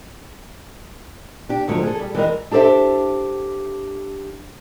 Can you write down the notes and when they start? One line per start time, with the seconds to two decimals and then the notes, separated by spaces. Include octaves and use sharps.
1.49 D4 G4
1.68 G#2 D3 F3 F#3 A3
1.83 G#4 A4
1.99 G3
2.15 E3 G3 G#3 A#4 D#5
2.51 D4 G4 A4 C5 E5